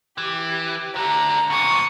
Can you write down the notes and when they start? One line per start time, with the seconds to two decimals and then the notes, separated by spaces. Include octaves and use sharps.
0.18 E3 G4
0.96 D3 A3 A#5
1.50 D2 A#2 C#6 D#6